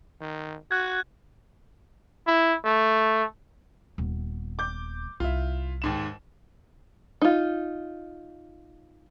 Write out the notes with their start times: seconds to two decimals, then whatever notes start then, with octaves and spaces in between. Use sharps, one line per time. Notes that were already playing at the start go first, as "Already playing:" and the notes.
0.21 D#3
0.71 F#4 F#6 G#6
2.27 E4
2.65 A3
3.98 D#1 B3
4.59 D6 G6
5.20 C2 E4 F4
5.82 D#2 G#2 E7
7.22 D#4 F4